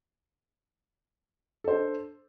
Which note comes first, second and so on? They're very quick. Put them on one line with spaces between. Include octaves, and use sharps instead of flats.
A4 C5 D4